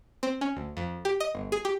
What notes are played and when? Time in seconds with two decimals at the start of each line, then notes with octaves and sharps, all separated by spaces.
0.23 C4
0.41 C#4
0.57 D2
0.77 F2
1.05 G4
1.20 D#5
1.35 G1
1.52 G#4
1.65 G4